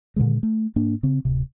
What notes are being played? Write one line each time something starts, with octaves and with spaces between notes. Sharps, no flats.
A#2 D3 D#3 G#3
A3
G#2 A#3 D4
C#3 C4
D1 C3